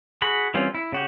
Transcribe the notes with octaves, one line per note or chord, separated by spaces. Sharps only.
F#4 G#4 B5
E3 G3 C4 C#4 F4
E4
C#3 F#4 G4